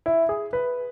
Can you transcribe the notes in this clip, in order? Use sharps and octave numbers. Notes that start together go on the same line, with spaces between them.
E4
G#4
B4